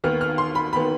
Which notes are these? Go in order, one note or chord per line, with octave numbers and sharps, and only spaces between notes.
D#2 D#3 B3 F6
F6
C6
B5
D#3 B3 B5